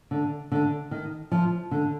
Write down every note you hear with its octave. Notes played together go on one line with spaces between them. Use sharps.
D3
D3
D#3
F3
D3